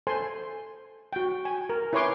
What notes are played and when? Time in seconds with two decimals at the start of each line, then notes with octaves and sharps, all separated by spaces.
0.07 A4 C5 G#5 C6
1.13 F#4 G5
1.45 G#5
1.70 A#4
1.93 E4 B4 C#5 G#5 C6 D6